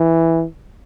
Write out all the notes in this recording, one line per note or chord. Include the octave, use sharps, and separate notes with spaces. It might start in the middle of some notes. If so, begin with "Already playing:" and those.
Already playing: E3